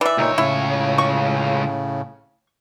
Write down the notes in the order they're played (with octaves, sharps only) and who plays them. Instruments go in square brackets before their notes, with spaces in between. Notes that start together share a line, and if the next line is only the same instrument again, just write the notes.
[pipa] E3 E5 [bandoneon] D5
[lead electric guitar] C#2 C#5 [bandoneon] A#2 D#4
[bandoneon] A2 C#3 [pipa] E4
[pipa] C#6